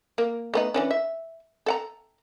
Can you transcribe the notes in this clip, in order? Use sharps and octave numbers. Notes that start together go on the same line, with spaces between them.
A#3
A3 B3 D#4
E3 C#4 D4
E5
A4 F#5 A#5